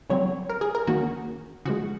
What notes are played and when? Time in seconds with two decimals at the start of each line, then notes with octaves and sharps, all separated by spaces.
0.10 C#3 F#3 C4 C#5
0.50 A#4
0.61 G#4
0.75 A#4
0.87 D#3 A#3 C#4 F#4
1.65 C#3 F3 G#3 F#4